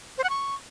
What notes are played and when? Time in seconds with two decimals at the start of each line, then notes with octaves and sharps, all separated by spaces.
0.18 C5
0.24 F#5
0.30 C#6